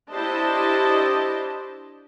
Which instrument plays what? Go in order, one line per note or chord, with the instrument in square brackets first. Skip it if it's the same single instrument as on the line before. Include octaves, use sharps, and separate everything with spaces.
[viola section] D4 E4 G4 C5 D#5 A5